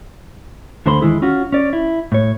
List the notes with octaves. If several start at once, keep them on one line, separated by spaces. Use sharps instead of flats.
D2 D3 A3 C5 B5 C6
E2 D#3 G#3 E4 G#4
C#4 F4 F#4
C#4 D5
E4
A2 C#5